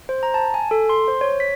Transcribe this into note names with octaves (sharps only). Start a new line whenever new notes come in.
C5
A#5
A5
G#5
A4
C6
C5
C#5
B6